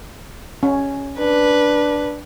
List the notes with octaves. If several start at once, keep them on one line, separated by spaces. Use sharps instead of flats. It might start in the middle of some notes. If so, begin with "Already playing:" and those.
C#4
D4 B4